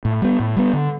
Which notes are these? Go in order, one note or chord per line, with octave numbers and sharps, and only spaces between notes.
A2
G3 B3
A2
G3 B3
D3